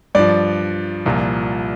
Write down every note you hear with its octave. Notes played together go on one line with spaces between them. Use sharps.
G2 F3 D5
C2 A#2 F3